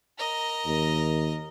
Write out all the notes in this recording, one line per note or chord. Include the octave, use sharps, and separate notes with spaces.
A#4 D#5
D#2